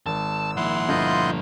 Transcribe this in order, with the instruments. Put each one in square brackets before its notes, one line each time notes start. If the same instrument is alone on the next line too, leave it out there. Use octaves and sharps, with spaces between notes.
[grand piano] G#1 [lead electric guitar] A5 [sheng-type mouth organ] E6
[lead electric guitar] F3 A#3 [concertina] E4 F#5 C6
[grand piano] G1 [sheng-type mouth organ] F4 D#5 G6